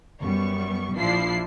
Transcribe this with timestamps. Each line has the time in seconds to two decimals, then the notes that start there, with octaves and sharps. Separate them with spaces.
0.24 F#2 G3 B3 C#6
0.98 A#1 F3 D4 E4 C7